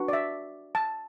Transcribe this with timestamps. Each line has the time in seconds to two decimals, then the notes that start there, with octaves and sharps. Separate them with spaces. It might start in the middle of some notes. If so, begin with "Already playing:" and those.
Already playing: D4 F#4 B4
0.08 D5
0.13 E5
0.75 A5